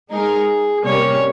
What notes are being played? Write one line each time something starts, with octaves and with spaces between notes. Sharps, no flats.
G#3 D#4 G#4 A#4
C3 G3 A#3 C#4 C#5